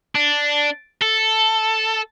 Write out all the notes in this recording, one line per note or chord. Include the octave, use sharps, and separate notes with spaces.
D4
A4